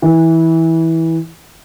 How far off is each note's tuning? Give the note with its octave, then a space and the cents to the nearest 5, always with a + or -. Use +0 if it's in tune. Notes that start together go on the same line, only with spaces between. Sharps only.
E3 -15